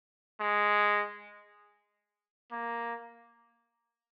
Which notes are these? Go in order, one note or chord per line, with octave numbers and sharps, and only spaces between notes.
G#3
A#3